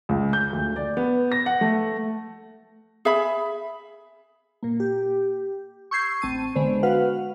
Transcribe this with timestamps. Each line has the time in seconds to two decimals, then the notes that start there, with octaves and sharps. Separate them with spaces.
0.09 C#2
0.33 G6
0.53 D2
0.76 D5
0.97 B3
1.32 A#6
1.46 F#5
1.61 A3
3.05 G#4 E5 B5
4.63 A#2 A#3
4.80 G4
5.91 C#6 E6 G6 G#6 C7
6.22 A1 C4 A5 C#6 D#7
6.55 D3 G#3 B3 C5
6.83 F#4 B4 F5 F#5 F6